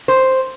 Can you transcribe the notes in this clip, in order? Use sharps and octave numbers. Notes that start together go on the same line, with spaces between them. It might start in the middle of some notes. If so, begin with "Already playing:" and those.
C5